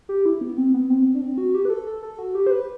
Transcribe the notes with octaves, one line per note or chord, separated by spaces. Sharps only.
G4
E4
B3
C4
B3
C4
D4
C4
F#4
G4
B4
A4
A4
A4
F#4
G4
C5
B4